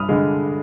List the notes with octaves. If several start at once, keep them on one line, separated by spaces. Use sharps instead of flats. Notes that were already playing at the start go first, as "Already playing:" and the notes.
Already playing: G2 B5 D#6 F6
D3 G#3